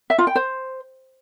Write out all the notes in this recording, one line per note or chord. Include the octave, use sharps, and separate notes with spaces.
E5
F4
G5
C5